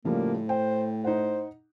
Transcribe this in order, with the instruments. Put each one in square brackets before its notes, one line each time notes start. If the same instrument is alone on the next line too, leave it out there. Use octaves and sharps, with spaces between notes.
[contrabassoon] A2 [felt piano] C#3 F3 G3 [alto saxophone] A#3
[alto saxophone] C5 [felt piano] G5
[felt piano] D#4 F#5 [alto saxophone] C5